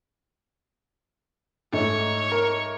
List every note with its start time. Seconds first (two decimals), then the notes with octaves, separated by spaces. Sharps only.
1.73 G#2 A3 C#5
2.32 A#4